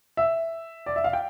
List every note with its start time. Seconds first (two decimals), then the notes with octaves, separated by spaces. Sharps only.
0.17 E5
0.86 D5
0.96 E5
1.04 F5
1.13 G5